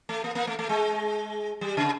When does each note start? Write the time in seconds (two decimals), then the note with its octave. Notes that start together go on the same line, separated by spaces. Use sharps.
0.09 A3
0.24 A#3
0.35 A#3
0.47 A3
0.59 A3
0.69 G#3
1.61 G3
1.77 C#3